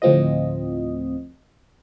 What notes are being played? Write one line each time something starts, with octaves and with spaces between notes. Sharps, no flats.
D2 A2 F3 C4 F4 D#5